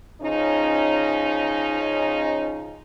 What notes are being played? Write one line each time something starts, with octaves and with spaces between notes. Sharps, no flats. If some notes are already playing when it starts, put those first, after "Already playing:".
C#3 F3 C#4 D#4